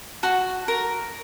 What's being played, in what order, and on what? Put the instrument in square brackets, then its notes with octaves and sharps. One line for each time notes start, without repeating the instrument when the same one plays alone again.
[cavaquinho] F#4 A5 C#6
A#4